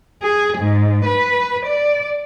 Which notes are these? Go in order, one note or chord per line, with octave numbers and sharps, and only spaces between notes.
G#4
G#2
B4
D5